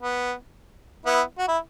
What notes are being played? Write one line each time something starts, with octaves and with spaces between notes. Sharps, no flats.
B3
B3 E4
F#4
E4